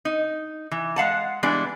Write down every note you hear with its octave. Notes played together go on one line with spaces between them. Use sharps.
D#4
E3
G#3 F5 F#5 A5
E3 G3 G#3 B3 D4